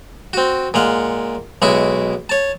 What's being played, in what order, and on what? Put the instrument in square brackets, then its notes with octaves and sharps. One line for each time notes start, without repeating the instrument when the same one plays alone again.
[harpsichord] C4 F#4
A#2 G#3 F5 F#5
B1 G#3 E4 F#4 C#6
C#5 A5